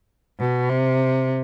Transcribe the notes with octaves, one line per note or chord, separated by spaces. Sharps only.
B2
C3